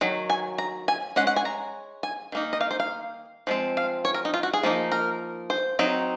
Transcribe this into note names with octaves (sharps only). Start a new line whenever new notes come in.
D#3 F#3
G#5
A#5
G#5
G#3 C#4 F#5
F#5
G#5
A#5
G#5
D#3 A#3 D#4
D#5
F5
C5
F5
F3 G#3 C4
F5
C#5
A#4
D#4
F4
F#4
G#4
F3 A#3 D#4
A#4
C5
F#3 C4 D#4